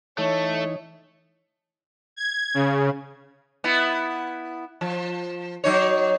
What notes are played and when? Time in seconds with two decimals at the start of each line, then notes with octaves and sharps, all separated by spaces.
0.18 E3 A3 D#4 C#5
2.16 G#6
2.54 C#3
3.64 B3 E4
4.81 F3
5.64 F#3 D#4 C#5